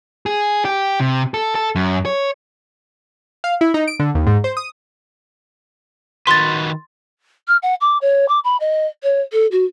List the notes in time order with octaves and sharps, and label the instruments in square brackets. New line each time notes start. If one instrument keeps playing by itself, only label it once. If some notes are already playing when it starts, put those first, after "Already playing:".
[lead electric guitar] G#4
G4
C3
A4
A4
F#2
C#5
[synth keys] F5
E4
D#4
D7
D3
D#2
G#2
C5
D#6
[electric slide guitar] D#3 F#4 B4 [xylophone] C6 A6
[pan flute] F6
F#5
D6
C#5
D6
B5
D#5
C#5
A4
F#4